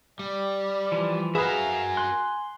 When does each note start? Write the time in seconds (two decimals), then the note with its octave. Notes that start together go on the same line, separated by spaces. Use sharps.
0.19 G3 D5
0.92 E3 F3
1.35 F#4 G#4 A#4 B4 E5 F5 G#5
1.97 C6 F#6